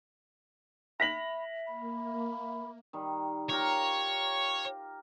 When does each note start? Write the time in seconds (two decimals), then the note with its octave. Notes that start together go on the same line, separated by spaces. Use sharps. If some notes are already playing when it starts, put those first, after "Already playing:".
1.00 E5 B5 A#6 B6 F#7
1.67 A#3 B5
2.93 D#3 G3
3.49 F4 G4 A#4 C#5